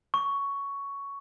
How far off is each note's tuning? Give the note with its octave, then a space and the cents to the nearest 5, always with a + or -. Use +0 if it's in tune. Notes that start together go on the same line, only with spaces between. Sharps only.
C#6 +10